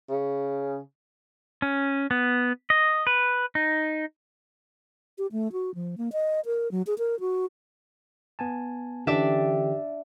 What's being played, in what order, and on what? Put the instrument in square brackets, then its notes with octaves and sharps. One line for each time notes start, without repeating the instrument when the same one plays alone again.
[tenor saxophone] C#3
[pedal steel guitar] C#4
B3
D#5
B4
D#4
[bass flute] G4
A3
F#4
F3
A#3
D#5
A#4
F#3
G#4
A#4
F#4
[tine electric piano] B3 G#5 A5
[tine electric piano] D3 E3 C#4 [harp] D4 D5 E5 [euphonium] G4